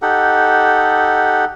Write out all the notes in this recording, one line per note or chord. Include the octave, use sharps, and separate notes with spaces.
D#4 G4 A4 F#5